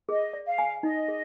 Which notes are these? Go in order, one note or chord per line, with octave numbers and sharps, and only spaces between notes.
G#4 D#5
D5
F5
G#5
D#4 D#5
G#4